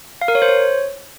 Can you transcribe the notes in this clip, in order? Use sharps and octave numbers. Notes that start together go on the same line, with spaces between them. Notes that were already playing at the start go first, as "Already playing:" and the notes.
F5
A#4
C#5
C5
C#5